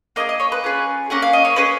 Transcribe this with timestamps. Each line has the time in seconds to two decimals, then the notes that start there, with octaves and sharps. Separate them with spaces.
0.16 A#3 D#4 G#4 D#5
0.29 D#5
0.40 C#5
0.52 B4
0.64 C#4 F4 G#4
1.10 A#3 C#4 G#4 F#5
1.22 F5
1.33 D#5
1.45 C#5
1.56 C#4 G#4 B4